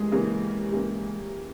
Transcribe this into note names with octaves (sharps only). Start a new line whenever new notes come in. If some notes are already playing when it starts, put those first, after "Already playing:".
Already playing: E3 G#3 A#3 C#4 G4
C#3 E3 A#3 C#4 G4
C#3 E3 A#3 C#4 G4